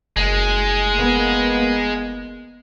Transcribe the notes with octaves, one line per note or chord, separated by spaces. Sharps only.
F#1 G#3
A#3 B3